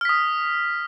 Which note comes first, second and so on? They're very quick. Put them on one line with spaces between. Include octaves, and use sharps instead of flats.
F6 B6 D#6